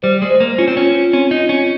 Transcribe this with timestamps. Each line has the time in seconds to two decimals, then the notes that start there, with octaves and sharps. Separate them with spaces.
0.03 G3 C5
0.22 G#3
0.30 C5
0.40 A#3
0.58 C#4 F4
0.68 C4
0.77 C#4
0.85 F4
1.13 C4 C#4
1.31 D#4
1.41 F4
1.49 C#4